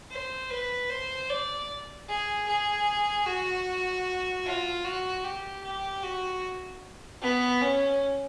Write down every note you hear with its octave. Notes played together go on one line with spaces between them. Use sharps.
C5
B4
C5
D5
G#4
G#4
F#4
F4
F#4
G4
G4
F#4
B3
C#4